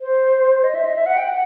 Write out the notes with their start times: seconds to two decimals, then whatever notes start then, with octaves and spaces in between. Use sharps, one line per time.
0.01 C5
0.64 D#5
0.75 E5
0.85 D#5
0.96 E5
1.06 F#5
1.17 G5
1.28 F#5